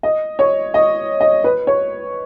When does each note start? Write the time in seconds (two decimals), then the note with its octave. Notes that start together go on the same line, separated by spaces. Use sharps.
0.03 D#5
0.39 C#5
0.74 D#5
1.20 D#5
1.44 B4
1.67 C#5